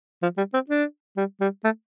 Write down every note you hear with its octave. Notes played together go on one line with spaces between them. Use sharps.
F3
G3
C4
D4
G3
G3
A3